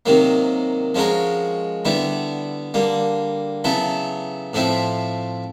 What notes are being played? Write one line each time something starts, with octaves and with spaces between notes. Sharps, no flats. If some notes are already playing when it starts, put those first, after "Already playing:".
C3 D#3 F#3 A#3
F3 G#3 C#4 F#4 A#4
D3 G3 B3 E4
D3 G3 A#3
C#3 F#3 B3 E4 A4
A2 F3 A3 C4 E4